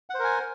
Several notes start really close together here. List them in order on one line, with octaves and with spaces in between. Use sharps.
F#5 C5 A#4 G#5